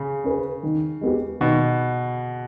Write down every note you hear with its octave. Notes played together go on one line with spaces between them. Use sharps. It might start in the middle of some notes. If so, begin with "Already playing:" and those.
Already playing: C#3
C#4 G#4 B4
D#3
G#3 B3 G4
B2 D#3